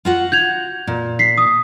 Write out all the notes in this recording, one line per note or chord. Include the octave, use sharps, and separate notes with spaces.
F4 F#4 F#5
G6 G#6 F7
A#2
B6 C7
D#6